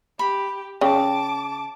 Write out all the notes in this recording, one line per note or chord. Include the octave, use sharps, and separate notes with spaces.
G4 B5
C#3 G5 A5 D6